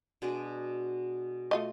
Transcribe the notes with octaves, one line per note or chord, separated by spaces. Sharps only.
B2 G#3 D4
A3 F4 D#5